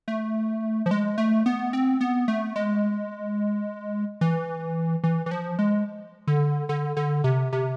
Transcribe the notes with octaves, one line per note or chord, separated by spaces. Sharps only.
A3
F3
G#3
A3
B3
C4
B3
A3
G#3
E3
E3
E3
F3
G#3
D3
D3
D3
C3
C3